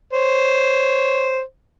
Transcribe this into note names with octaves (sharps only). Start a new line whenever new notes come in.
C5 C#5